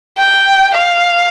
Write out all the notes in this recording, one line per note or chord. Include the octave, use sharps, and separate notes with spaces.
G5
F5